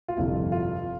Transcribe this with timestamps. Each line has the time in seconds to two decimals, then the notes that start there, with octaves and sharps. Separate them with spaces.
0.08 F4
0.17 G1 F2 C3 E4
0.52 F4